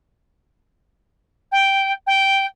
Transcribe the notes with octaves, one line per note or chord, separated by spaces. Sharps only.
G5
G5